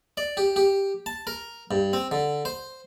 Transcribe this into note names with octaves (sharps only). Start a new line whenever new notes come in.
D5
G4
G4
A5
A#4
G2
C4
D3
C5